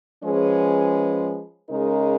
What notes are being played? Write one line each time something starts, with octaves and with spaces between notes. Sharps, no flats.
F3 G#3 C#4 G#4 B4
C#3 G#3 D#4 A#4